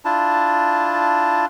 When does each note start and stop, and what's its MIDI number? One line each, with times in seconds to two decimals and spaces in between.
0.05 1.45 62
0.05 1.45 64
0.05 1.45 65
0.05 1.45 81